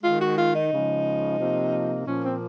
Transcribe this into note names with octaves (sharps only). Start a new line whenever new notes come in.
D#3 G#3 F4
F#4
F4
D#4
C#3 F3 G#3
C3 F3 A#3
A#2 F3 A#3 C#4
C4